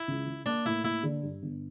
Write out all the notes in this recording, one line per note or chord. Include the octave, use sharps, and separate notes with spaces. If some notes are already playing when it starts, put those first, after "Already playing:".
Already playing: E4
C#2
C#3
A#3 D4
A2 E4
A#3 E4
D3
G2
G1